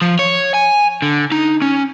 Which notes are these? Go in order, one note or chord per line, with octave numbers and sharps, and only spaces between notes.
F3
C#5
G#5
D3
D#4
C#4